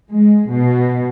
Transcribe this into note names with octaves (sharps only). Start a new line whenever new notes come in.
G#3
B2